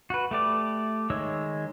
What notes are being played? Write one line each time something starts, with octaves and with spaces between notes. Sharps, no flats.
F#4 B4
A3 G4 D5
D#3 G#3 C#5 E6